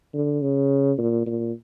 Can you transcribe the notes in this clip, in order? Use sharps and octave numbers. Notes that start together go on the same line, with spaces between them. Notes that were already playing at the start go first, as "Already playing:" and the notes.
D3
C#3
A#2
A#2